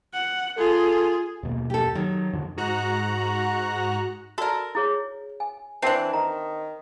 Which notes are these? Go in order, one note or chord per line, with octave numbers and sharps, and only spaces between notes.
F#5
F4 G#4 A4
D#2 B2 A#3
G4 A4
D#3 F#3
F2 D3
G#2 F#4 A#5 F#6
F#4 A4 A#4 D5
E4 G#4 C#5
G#5
E3 C4 D4 A#4 A5
D#3 A#5